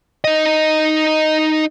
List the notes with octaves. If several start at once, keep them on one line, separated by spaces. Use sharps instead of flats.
D#4 D#5